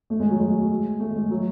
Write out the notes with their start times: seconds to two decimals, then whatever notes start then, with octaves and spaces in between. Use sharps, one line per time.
0.10 A3
0.20 G#3
0.30 F#3
0.40 G#3
1.00 A3
1.15 G#3
1.30 F#3